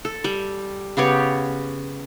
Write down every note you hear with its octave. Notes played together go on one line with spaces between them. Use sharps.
A4
G3
C#3 B3 G4 C#5